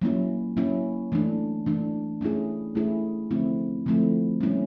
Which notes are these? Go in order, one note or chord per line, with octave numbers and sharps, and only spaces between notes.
F#3 A#3 C#4 E4
F#3 A#3 C#4 E4
E3 A3 D4
E3 A3 D4
A3 C#4 E4 G#4
A3 C#4 E4 G#4
D3 F3 A3 C4 E4
D3 F3 A3 C4 E4
G3 A#3 C#4 E4